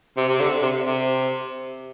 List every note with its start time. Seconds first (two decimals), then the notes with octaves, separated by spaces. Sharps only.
0.17 C3
0.29 C3
0.40 D3
0.62 C3
0.86 C3